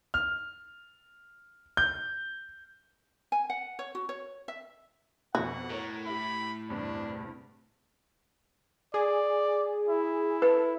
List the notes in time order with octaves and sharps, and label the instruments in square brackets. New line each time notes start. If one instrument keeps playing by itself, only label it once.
[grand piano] F6
G6
[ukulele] G#5
F#5
C#5
F#4
C#5
E5
[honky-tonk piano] F2 B2 [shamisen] F#4 [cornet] F#5
[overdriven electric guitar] A2 [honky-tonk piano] A3 A#4 C#5
[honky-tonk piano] E4 G4 [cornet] B5
[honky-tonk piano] E2 G2 C3 [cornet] D4
[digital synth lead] G#4 [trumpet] D5
[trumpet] E4
[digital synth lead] A4 [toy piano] B4